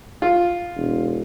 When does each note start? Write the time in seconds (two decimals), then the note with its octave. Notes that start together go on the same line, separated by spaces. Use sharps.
0.22 F4
0.76 E1